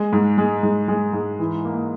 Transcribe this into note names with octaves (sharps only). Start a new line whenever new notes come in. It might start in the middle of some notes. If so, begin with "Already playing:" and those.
Already playing: G#3
G#2
G#3
G#2
G#3
G#2
E3
A#3